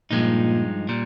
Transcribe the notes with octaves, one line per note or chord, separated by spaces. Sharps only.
G2 A#2 F3 G#3 D#4
A#2 G3